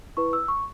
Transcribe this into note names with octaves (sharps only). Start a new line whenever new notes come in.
E4 B4 C#6
E6
C#6